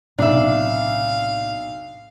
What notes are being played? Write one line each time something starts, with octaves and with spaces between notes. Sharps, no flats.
B1 A2 C3 D4 D5 E5 F5